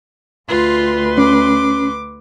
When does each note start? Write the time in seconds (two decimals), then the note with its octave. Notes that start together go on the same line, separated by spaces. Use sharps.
0.48 D2 F4 B4 C6
1.18 C#4 D6